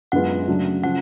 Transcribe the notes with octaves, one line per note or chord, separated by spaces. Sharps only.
F#2 D3 G#3 B3 F4 F#5
C#3 F#3 A3 D4
C#3 F3 F#5